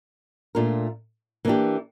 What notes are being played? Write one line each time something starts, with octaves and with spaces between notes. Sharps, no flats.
A#2 A3 D4 F4 A#4
E3 A#3 D4 G4